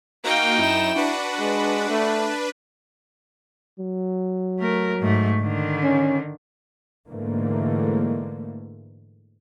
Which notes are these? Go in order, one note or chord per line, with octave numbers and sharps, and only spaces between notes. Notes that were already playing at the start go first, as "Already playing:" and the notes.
A#3 D#4 F#4 F5 G5
F#2 E4 E7
D4 F#4 B4
G#3
A3
F#3
A3 A#4
G#2 A3
D3 D#3
C#4
G#2 D3 E3 A3 A#3